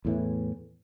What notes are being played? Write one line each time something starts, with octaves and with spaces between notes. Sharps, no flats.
E2 A2 E3